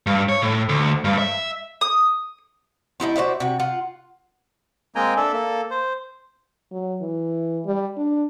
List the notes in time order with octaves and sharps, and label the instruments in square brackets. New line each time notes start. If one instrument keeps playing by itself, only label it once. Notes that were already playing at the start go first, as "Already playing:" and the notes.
[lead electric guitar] G2
C#5
A2
D2
G2
E5
[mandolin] D#6
[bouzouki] A3 D#4 E4 C5
F#4 C5 D5 E5
C3 F#4
F4 F#5
[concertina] G#3 A#3 C4 G5 G#5 A#5
D4 A4 E5
A#3 A4
C5
[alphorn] F#3
E3
G3
D4